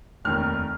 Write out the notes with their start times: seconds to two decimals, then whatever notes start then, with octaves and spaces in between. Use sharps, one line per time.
0.25 F1 D#2 D#3 F6